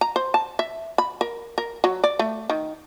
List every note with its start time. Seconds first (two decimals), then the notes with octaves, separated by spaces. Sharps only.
0.01 A#5
0.16 C5
0.34 A5
0.59 E5
0.98 B5
1.21 A#4
1.58 A#4
1.84 F#3
2.04 D5
2.19 A3
2.50 D#3